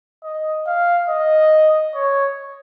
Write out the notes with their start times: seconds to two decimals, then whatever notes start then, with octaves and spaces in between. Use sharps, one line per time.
0.24 D#5
0.67 F5
1.09 D#5
1.95 C#5